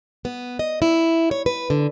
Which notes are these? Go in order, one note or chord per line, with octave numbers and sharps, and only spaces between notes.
B3
D#5
E4
C#5
B4
D3